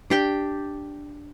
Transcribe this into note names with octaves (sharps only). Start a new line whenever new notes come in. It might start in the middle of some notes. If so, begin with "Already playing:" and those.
D4 G4 G5